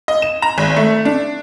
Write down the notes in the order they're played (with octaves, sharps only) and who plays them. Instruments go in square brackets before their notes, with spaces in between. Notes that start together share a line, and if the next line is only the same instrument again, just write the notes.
[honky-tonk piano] D#5
E7
A#5
G#1
A3
D4